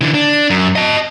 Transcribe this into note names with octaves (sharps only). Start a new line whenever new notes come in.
D3 E3
D4
F#2
D#5 A5